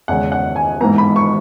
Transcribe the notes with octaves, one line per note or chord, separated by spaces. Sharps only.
E2 C#3 G#3 C#4 F#5
F#5
G#5
G#2 E3 B3 A#5
B5
C#6